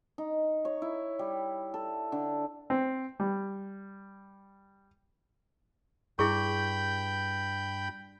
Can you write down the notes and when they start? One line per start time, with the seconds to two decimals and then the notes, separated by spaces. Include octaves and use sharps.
0.18 D#4
0.65 C#5
0.82 E4
1.19 G3
1.74 A4
2.12 D3
2.70 C4
3.20 G3
6.19 G2 E4 G#4 G5 B5 C#6 G6